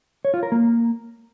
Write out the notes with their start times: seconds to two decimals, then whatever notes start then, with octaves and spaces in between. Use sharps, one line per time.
0.25 C#5
0.34 F4
0.43 A#4
0.52 A#3